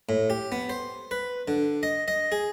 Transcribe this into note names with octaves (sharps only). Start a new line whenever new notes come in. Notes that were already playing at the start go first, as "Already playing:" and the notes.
A2
G4
B3
C5
B4
D3
D#5
D#5
G#4